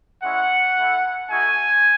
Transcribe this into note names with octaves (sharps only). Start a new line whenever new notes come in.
G#3 C#4 E4 F#5
A3 E4
A3 D#4 F#4 G#5